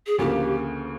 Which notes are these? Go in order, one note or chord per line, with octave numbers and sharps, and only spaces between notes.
G#4
D2 C#3 F3 A#3 G4